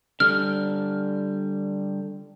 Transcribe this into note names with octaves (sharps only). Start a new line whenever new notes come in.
D3 G3 F6